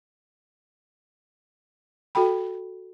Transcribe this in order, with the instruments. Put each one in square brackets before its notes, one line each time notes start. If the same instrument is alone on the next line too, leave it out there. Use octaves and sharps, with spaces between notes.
[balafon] F#4 A4 G5 B5